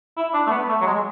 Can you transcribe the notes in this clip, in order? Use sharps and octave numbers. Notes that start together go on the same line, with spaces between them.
E4
D4
A3
B3
A3
F#3
G#3